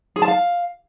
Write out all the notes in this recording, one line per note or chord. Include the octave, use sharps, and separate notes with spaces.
G#4
A5
F5